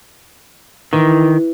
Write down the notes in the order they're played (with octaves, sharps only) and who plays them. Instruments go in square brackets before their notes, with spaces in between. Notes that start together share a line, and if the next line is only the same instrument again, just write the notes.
[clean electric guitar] D#3 [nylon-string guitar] E3